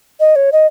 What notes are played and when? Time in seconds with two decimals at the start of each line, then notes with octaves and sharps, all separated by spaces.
0.20 D#5
0.36 C#5
0.52 D#5